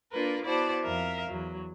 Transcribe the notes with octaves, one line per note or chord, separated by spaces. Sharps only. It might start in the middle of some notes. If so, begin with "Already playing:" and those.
A#3 D4 F4 A#4 B4
B3 E4 F#4 C5 D5 A5
F2 A#4 E5 F5
E2 F#3